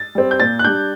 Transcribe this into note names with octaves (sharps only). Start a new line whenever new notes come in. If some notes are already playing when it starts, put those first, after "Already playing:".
Already playing: A6
G3 C4
G6
A#2 A6
F#6
G3 D4 G6